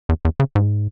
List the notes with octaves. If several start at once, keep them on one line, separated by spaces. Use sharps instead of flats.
E2
E2
C#3
G#2